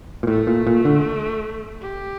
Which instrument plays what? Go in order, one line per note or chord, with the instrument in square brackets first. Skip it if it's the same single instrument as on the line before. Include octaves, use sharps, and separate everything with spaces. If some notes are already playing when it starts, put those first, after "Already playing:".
[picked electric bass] A#2
[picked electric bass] A2 [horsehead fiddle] A3
[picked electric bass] A#2
A#2
D3
[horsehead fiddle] G4